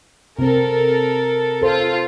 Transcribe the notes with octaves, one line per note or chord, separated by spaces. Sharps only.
C3 C4 A4 A#4
F4 A4 C5